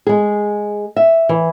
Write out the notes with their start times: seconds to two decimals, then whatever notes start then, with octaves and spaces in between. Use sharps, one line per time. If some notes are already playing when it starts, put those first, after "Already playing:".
0.07 G#3 G#4
0.96 E5
1.29 E3